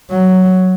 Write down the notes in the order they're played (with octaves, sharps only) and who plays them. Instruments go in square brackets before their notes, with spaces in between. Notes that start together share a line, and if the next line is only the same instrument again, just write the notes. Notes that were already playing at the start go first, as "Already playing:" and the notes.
[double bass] F#3